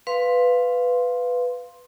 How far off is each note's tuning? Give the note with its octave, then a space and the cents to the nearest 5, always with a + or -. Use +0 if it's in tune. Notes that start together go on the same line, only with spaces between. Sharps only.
B4 +10 F5 +0 C6 +5